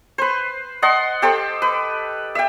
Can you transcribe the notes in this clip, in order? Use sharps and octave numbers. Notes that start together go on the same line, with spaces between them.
B4 C5
D#5 F#5 A5 C6
G4 A4 C5 G5
B4
E5 G5